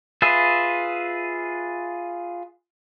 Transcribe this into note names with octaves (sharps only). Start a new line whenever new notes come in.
F4 G#4 B4 E5